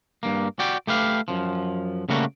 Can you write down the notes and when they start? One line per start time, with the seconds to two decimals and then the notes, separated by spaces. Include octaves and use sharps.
0.23 G2 A#3
0.59 F#4 D5 G5
0.87 A3 G4 B4 F5
1.28 F#2 F3
2.09 C#3 G3 A3 A#3 F#4